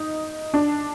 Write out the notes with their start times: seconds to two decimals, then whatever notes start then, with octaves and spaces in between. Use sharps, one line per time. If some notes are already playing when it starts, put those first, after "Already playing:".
Already playing: D#4
0.54 D4